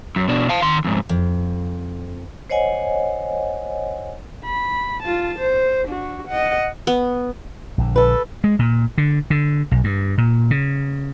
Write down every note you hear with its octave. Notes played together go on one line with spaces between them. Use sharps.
F#2
B2 D4
F5 A5
D#3 C6
F2 G#2
F2
C5 C#5 D#5 F#5 G#5
B5
F4 A5
C5
D4 F#4
D#5 F#5
B3
A#1 D3
A4 B4
G#3
A#2
D3
D3
B1
G2
A#2
C#3